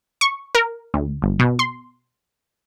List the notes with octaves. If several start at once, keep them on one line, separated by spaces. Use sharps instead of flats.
C#6
A#4
D2
G1
B2
C6